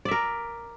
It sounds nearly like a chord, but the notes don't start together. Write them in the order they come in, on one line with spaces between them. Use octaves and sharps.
D5 E5 A#4